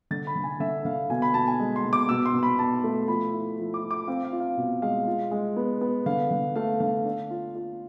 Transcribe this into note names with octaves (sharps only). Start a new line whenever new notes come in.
D3 A6
B5
D3
G#5
D3 E5
D3 F5
B2 G#5
B5
B2 A5
G#5
G#3
C6
B2
D6
B2 E6
C6
B2
B5
B2 A5
A3
F3 B5
E4
F3
D6
F3
D6
C4 F5
F5
F4
F5
B2
G#3 F5
F4
G#3
B3
B3
D3 F5
D3
A3 F5
D3 F5
D4
F4
F4